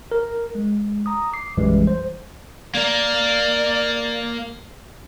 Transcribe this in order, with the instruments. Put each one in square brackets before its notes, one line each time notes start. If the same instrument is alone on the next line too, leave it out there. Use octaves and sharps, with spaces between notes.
[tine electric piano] A#4
G#3
A#5 D#6
D6 C7
A#1 F#2 E3 G3 G#3
C5
[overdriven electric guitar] A#3 A#4 [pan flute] D5